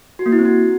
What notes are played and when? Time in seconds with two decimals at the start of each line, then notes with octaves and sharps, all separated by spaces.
0.19 F#4
0.26 A#3
0.32 E4
0.39 C4
0.45 F#4